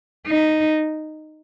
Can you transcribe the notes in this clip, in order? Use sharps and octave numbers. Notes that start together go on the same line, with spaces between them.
D#4